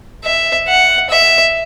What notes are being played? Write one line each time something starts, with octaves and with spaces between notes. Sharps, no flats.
E5
F#5
E5